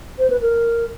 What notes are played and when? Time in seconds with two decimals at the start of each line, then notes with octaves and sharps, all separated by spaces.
0.19 C5
0.30 B4
0.41 A#4